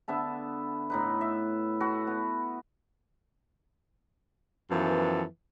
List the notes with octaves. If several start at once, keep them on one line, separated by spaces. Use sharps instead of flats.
D3 B3 E5 A5
A2 D#4 B4
E5
F#4 A4 B4
B3
F#2 E3 F3 B3 A4